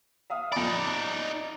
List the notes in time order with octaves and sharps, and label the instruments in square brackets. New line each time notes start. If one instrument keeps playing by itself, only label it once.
[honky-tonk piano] E5 F5 D#6
[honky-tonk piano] F2 B5 [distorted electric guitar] D#4 D5
[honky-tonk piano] A6